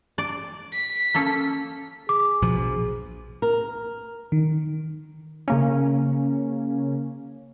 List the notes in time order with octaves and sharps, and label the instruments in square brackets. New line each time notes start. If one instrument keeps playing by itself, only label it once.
[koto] D5
[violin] B6
[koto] A#3 C#4 A4
[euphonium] G#4 [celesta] D6
[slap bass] A#1 B2 F3
[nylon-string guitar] A#4
[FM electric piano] D#3
[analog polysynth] C#3 A#3 C#4